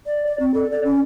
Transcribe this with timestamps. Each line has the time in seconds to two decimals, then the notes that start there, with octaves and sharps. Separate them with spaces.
0.06 D5
0.26 D5
0.40 C4
0.54 A4
0.71 D5
0.85 C#4